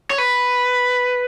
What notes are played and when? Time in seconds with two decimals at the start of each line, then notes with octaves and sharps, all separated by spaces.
0.10 C#5
0.18 B4